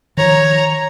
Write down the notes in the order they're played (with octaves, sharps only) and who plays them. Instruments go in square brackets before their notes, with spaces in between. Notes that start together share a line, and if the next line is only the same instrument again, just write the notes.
[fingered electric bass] D#3 F3 [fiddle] C#5 A#5